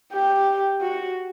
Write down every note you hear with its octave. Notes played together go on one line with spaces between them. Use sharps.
G4
F#4